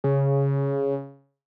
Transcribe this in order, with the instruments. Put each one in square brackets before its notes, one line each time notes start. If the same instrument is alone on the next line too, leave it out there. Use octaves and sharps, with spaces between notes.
[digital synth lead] C#3